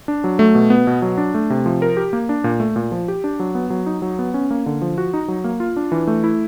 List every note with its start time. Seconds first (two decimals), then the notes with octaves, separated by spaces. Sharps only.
0.08 D4
0.24 F#3
0.39 A3
0.55 B2
0.70 B3
0.87 B2
1.02 F#3
1.18 D4
1.34 A3
1.50 C3
1.66 F3
1.82 A#4
1.97 G4
2.13 A#3
2.29 D4
2.44 A#2
2.60 A3
2.76 A#2
2.92 F3
3.08 G4
3.24 D4
3.40 F#3
3.55 B3
3.70 F#3
3.86 D#4
4.02 F#3
4.19 B3
4.34 C#4
4.51 A#3
4.66 D3
4.82 F3
4.98 F#4
5.14 D#4
5.28 F#3
5.44 A#3
5.60 F4
5.76 D4
5.92 E3
6.07 A3
6.24 E4